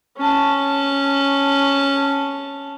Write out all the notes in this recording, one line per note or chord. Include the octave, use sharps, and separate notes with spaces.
C#4 A5